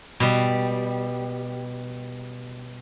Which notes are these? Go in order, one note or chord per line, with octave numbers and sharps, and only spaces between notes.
B2 G3